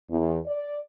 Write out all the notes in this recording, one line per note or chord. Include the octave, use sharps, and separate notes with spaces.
E2
D5